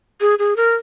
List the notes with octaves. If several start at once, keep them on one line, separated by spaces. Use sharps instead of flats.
G#4
G#4
A#4